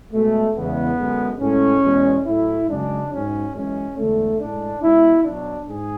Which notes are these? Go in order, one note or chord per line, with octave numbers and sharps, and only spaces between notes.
B2 G#3 A3
E2 C#3 E3 G#3 B3
F#2 D3 G#3
A2 G#3 C#4
E2 B2 G#3
A2 F#3 E4
F#2 C#3 G#3 D4
G#2 F#3 C#4
F#2 E3 G#3 C#4
E2 D3 G#3 A3
A2 G#3 D4
B2 G#3 E4
B2 F#3 D4
G#2 G#4